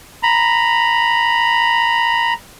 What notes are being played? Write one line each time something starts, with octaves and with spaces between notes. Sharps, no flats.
A#5 B5